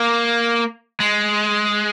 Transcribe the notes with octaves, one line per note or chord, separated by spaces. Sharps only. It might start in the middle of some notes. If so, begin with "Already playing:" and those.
Already playing: A#3
G#3